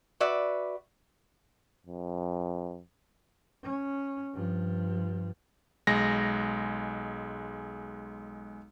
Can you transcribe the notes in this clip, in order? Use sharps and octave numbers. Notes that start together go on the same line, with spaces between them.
F#4 B4 D5 E5
F2
C#4
G2 F3
B1 G#3 A#6